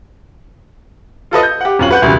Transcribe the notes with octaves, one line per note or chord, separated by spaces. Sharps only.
F4 A4 B4 D#5
G6
G4 F#5
D1 C#4 F4 F#7
B4 F#5 G6
E1 C#2 E3 G3 F#4